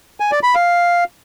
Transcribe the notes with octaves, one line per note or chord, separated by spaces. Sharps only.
G#5
D5
B5
F5